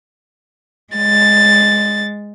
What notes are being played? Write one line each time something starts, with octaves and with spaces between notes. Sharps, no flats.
G#3 A6